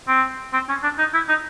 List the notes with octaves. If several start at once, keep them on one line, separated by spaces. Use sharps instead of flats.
C4
C4
C#4
D4
D#4
E4
D#4